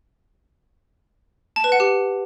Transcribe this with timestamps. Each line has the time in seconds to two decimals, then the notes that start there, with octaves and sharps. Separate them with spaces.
1.56 A5
1.64 B4
1.72 F#5
1.80 G4